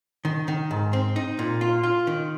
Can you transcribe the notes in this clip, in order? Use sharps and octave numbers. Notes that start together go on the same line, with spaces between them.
D#3
D#3
G#2
C4
D#4
A#2
F4
F4
D#3